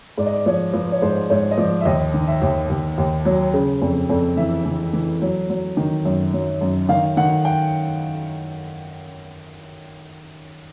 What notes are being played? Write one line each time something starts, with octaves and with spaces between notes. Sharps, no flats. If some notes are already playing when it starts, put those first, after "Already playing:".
G#2 D5
D#5
D5
F3 C#5
F3 B4
C#5
G#2 C5
G#2 C#5
D#5
F3 D5
E5
D#2 D#5
D#3
E5
D#2
D#2
D#2
F#3
C#3
F2
F2
E3 E5
E3
E3
F#3
F#3
D#3
F#2
F#3
F#2
D#3 F5
D#3 F#5
G5